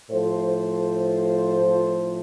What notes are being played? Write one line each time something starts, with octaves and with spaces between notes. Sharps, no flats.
A2 F3 A4 C5
A2 F3